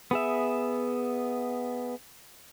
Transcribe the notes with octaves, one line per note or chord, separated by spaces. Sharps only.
B3 G#4 E5